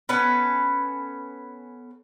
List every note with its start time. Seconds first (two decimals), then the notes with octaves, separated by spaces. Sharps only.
0.09 B3 C#4 A4 B4